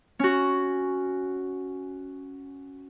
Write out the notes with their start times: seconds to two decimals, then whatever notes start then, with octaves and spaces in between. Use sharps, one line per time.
0.19 C#4 F#4